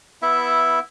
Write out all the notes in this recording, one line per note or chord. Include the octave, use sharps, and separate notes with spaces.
B3 E4 E5